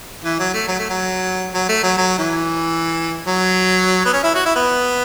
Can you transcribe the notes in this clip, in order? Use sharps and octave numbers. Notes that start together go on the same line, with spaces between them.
E3
F#3
A3
F#3
A3
F#3
F#3
A3
F#3
F#3
E3
F#3
B3
C#4
E4
F#4
E4
B3